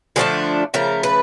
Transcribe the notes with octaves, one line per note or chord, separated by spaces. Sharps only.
D3 F3 A3 D4 G#4
C#3 F3 A3 A#4
B4